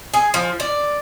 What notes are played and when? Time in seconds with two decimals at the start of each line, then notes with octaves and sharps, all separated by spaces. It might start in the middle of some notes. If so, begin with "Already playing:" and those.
0.14 G#4
0.34 F3
0.60 D5